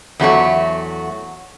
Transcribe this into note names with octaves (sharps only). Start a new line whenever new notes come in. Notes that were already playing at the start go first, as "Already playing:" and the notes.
E2 F#3 A3 F#4